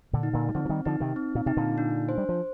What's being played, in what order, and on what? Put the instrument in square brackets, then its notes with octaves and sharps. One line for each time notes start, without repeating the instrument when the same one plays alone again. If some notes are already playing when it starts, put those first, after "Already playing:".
[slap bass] A#2 D3
[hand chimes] D#4
[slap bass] A#2 D3
G3
[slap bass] D3 F3 [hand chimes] C4
[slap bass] F3
D#3 G3
[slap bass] D3 F3 [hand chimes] D#4
[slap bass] C3 D#3
[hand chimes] C4
[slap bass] A#2
[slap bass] C3 [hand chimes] D#4
[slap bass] A#2 D3
[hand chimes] D4
C5
[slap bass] G3
F3